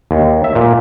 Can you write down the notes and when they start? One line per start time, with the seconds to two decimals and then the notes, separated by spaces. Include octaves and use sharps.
0.11 D#2
0.44 E5
0.55 A#2